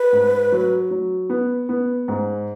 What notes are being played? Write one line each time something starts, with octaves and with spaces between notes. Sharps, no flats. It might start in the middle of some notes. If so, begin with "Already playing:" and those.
Already playing: B4
G#2
F#3
F#3
B3
B3
G#2